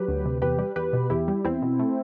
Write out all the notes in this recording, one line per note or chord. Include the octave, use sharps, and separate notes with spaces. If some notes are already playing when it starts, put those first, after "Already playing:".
Already playing: F#3 G4 B4
D2
C3
E2 G4 B4
G3
E2 G4 B4
B2
E2 E4 G4
G3
E2 C4 E4
B2
A3